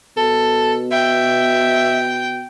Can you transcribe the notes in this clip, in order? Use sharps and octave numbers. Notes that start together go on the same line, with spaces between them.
B2 A4
E5 G5